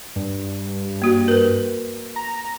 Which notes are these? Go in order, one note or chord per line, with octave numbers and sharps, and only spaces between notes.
G2
A#3 F#4
A#4 B4
A#5